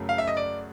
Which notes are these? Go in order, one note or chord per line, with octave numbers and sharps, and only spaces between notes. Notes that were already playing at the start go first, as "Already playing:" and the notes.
Already playing: F#2 C#3 F#3 A3
F5
E5
D#5
D5